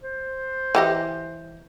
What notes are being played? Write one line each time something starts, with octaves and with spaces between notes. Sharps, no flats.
C5
E3 G4 D#5